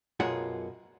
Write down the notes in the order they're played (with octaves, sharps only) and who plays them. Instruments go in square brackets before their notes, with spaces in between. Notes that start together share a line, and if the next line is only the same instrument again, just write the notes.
[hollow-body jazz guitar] B1 F#2 F4 G#4 F#5